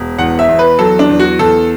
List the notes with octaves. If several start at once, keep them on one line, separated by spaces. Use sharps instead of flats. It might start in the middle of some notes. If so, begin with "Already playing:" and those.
Already playing: E1
E2 F#5
E5
E2
B4
F#3 A4
D4
E2
F#4
E2 A4